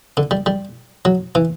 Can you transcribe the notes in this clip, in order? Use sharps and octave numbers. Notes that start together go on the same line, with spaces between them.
D3
G3
G3
F#3
E3